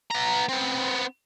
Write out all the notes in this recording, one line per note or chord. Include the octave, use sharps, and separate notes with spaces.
B3 A#5
B3 C4